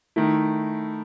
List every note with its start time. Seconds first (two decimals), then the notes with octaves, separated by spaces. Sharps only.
0.16 D#3 A3 E4